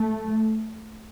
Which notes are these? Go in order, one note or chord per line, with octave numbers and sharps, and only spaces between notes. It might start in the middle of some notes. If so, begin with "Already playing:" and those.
Already playing: A3